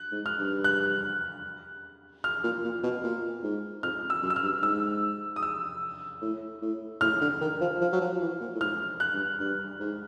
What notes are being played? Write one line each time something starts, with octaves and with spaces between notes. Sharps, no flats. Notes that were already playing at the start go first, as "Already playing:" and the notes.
Already playing: F#6
G#2
F6
G2
F#6
F6
A#2
A#2
B2
A#2
G#2
F2 F6
E6
F#2
E6
F6
G2
G#2 E6
D#6
E6
A2
A2
A2 F6
D3
D#3
F3
F3
F#3
F3
E3
A#2
A2
G#2 F6
F#6
G2
G2
G#2